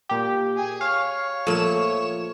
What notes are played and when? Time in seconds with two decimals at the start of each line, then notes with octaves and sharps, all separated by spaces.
0.09 A#2 G4
0.57 G#4
0.81 C#5 F5
1.47 A#2 F3 A3 E7